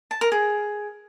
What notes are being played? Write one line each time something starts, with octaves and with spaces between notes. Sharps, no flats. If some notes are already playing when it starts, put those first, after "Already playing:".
A5
A#4
G#4